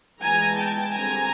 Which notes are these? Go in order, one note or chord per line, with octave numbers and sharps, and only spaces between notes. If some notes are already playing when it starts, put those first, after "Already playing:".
E3 G#3 B3 G#5 A#5
G5 A5
D3 G3 C4 G#5 A#5